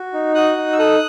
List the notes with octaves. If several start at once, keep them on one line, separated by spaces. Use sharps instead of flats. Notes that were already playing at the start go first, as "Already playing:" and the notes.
Already playing: F#4
D#4
F#4 D#6 F#6
D#4
E6
A4 D#6 F#6